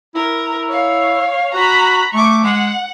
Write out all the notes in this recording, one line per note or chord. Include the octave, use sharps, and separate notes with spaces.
E4 A#4
C#5 F5
F#4 A#5 B5
A3 C#6 D6
G#3 F#5